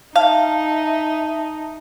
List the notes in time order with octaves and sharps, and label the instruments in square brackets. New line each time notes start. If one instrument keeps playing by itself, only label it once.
[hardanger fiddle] D#4 [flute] E5 [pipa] F5 [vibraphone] A5